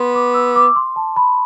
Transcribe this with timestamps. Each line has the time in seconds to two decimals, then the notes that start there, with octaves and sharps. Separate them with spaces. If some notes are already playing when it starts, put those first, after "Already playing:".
Already playing: B3 C6
0.15 D6
0.34 E6
0.56 D6
0.76 C6
0.96 A5
1.16 B5